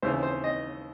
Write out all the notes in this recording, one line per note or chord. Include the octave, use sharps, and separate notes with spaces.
D#2 C#3 E3 C5
C5
D#5